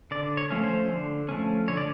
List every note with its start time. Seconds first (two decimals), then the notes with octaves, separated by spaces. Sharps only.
0.11 D3 D5
0.37 C#5
0.50 F3 A3 C#4
0.64 C5
0.90 D3
1.29 F3 A3 C#4
1.68 D3 C#5
1.77 D5